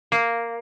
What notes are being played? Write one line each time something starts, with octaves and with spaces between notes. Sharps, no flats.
A#3